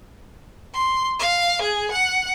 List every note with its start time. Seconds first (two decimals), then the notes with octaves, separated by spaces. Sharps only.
0.73 C6
1.18 F5
1.61 G#4
1.91 F#5